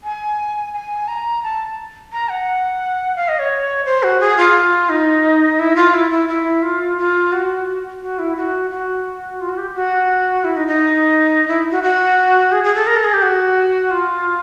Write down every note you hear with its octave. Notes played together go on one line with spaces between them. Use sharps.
G#5
G#5
A#5
A5
A#5
F#5
F5
D#5
C#5
C5
F#4
G#4
F4
D#4
E4
F4
E4
E4
E4
F4
F4
F#4
F#4
E4
F#4
F#4
F4
F#4
G4
F#4
E4
D#4
D#4
E4
F#4
F#4
G#4
G#4
A4
A#4
A4
G#4
G4
F#4
F4